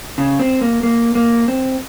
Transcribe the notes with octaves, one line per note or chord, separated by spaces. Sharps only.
C#3
C4
A#3
A#3
A#3
C4